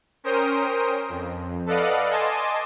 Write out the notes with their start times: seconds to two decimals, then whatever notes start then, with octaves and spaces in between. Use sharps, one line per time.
0.24 C#4 A#4 C5 G5 D#6
1.09 F2
1.66 A4 B4 D5 D#5 F5 F#5
2.09 D#5 G#5 A5 C6 D6